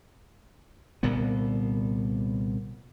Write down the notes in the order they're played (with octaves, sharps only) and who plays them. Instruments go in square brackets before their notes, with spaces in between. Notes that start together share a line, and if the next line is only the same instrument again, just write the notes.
[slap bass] C2 A#2 D3 B3